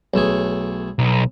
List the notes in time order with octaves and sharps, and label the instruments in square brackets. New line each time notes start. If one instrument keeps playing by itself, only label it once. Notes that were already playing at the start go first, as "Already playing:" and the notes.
[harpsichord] B1 A3 G#4
[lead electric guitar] B1